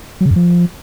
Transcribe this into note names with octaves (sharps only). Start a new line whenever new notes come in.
F#3
C#3
F#2
F3